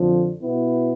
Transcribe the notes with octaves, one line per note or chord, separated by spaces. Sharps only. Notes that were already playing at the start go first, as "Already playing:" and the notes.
Already playing: F2 D3 F3
B2 B3 E4